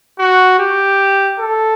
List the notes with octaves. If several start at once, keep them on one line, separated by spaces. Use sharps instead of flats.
F#4
G4
A4